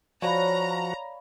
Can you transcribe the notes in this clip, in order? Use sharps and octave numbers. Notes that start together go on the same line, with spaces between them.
F3 F#4 C#5 D5 F5 A#5 B5